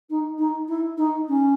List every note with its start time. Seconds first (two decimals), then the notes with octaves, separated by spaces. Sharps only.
0.09 D#4
0.38 D#4
0.67 E4
0.97 D#4
1.28 C#4